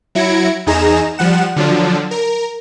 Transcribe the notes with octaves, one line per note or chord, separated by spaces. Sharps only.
F#3 E4 G#6 A#6 C#7 D7
E2 D#4 G#4 A#5 E7
F3 G3 F#5 E7
D3 F3 F#3 D4
A#4